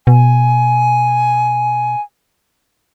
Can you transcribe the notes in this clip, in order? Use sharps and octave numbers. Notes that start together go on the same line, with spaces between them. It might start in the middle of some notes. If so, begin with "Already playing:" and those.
B2 G#5